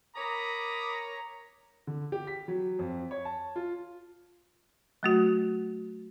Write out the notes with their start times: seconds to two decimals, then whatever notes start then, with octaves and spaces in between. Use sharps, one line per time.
0.16 A#4 C#5 A#5 B5 D6 D#6
1.87 D3
2.12 G4
2.27 B6
2.48 F#3
2.79 F2
3.11 C#5
3.25 A5
3.56 F4
5.03 F#3 A3 F#4